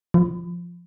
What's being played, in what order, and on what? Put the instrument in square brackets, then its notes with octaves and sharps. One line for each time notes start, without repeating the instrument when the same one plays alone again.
[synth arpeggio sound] F3